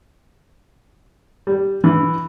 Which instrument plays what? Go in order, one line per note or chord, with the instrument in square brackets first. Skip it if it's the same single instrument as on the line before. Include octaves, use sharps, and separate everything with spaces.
[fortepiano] G3
E3